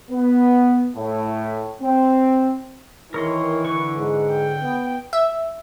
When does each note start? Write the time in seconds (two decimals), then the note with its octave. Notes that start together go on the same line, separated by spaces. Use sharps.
0.11 B3
0.96 A2
1.81 C4
3.14 D#3 E3 A#4 C#5 C6
3.64 D3 B4 C#6
3.98 G#2
4.31 G5
4.62 B3
5.13 E5